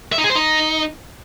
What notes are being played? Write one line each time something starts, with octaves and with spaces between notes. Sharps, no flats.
E5
D#4
G#4
C5
D#4